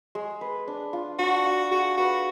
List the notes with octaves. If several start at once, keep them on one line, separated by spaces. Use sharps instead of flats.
G#3
B4
D4
F4
D4 F#4
F5
F#4 G#4
F#4 B4